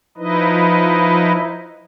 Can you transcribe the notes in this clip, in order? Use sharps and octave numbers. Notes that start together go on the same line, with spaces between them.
F3 D#4 E4 B4 D#5